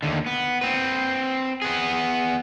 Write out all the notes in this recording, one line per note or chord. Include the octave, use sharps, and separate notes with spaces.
D#2 D3
B3
C4 B4
B3 G#4